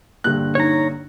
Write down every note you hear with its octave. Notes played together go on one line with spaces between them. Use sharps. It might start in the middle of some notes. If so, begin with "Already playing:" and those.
A#1 G2 D3 F#6
D#4 C#5 A#5